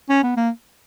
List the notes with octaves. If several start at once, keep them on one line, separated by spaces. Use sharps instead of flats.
C#4
B3
A#3